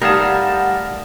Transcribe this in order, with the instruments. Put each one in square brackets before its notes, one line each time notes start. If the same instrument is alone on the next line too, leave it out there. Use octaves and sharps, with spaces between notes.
[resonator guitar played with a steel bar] G3 [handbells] A3 D#4 D#6 [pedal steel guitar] A#4 F5 A5 [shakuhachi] F#5